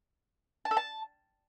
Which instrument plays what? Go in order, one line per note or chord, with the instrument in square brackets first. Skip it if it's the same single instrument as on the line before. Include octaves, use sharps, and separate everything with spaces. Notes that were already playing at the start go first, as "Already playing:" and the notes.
[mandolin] A5
A4
A5